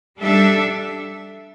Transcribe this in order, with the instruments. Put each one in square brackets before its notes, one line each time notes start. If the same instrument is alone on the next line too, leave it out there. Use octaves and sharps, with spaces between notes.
[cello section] G3 D4 A4 E5